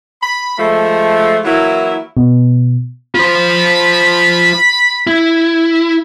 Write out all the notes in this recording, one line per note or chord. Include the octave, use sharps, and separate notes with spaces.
B5
F3 G#3 A3
E3 F#3 A#3 E4
B2
F4 C5 B5
E4